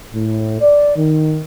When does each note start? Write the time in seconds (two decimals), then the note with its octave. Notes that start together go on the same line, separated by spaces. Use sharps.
0.15 A2
0.61 D5
0.97 D#3